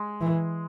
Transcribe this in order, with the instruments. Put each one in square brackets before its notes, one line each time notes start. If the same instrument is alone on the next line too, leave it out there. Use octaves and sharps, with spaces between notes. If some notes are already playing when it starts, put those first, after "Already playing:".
Already playing: [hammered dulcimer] G#3
[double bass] E3